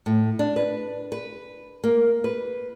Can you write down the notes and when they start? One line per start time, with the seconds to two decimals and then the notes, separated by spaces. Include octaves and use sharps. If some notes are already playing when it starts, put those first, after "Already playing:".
0.06 A2
0.39 D4
0.56 B4
1.12 B4
1.84 A#3
2.24 B4